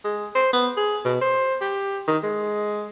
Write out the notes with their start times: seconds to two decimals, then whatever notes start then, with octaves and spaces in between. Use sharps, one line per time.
0.04 G#3
0.35 C5
0.53 B3
0.77 G#4
1.05 B2
1.21 C5
1.61 G4
2.07 D#3
2.23 G#3